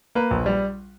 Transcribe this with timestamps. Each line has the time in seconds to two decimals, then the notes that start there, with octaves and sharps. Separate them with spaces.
0.15 A#3 B4
0.31 A#1
0.46 G3